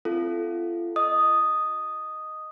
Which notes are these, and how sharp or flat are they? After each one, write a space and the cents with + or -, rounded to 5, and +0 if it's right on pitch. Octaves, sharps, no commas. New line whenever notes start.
C4 +0 F4 -35 A4 -15
D#5 +0 D#6 +0